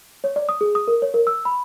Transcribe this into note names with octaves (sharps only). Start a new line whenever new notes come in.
C#5
D5
D#6
G#4
D#6
A#4
C#5
A#4
E6
B5